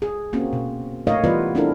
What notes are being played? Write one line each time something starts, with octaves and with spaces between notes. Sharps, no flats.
G#4
A#3 C4 C#4 F#4
B2
A3 D#4 A#4 C#5 D#5 F5
E3 G3 B3 F4 B4 D5
C4 D4 E4 A4 A#4